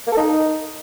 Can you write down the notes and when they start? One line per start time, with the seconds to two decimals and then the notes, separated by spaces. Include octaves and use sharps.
0.07 A#3
0.12 A4
0.17 D#4